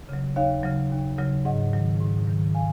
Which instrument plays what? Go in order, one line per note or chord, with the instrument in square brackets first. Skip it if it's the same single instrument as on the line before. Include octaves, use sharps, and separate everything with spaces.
[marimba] C#3 F#3
D#2 C#5 F5
C#3 F#3
D#2
C#3 F#3
G#2 D#5 F#5
D#3 F#3
G#2
D#3 F#3
F5 G#5